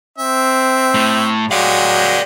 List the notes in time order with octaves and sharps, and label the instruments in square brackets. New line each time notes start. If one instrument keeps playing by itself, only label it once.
[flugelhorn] C4 [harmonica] E5
[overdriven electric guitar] A2
[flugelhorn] F#3 [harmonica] G#3 G4 [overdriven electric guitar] D5 F5